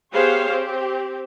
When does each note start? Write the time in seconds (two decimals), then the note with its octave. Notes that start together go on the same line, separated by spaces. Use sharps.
0.12 B3 G4 G#4 C5 C#5 F5
0.48 C4 G4